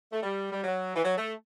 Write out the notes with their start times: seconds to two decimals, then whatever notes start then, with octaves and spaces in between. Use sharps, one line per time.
0.12 A3
0.23 G3
0.52 G3
0.64 F#3
0.96 E3
1.04 F#3
1.18 A3